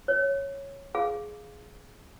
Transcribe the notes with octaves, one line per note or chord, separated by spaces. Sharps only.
C#5
G#4 F5